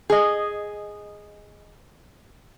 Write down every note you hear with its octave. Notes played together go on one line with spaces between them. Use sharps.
G#4 D#5